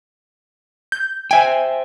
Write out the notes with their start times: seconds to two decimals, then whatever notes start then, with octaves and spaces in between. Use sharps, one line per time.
0.92 G6
1.31 C5 E5 G5 G#5